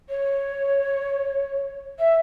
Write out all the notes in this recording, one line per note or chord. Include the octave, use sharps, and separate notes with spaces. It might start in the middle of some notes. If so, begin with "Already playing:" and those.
C#5
E5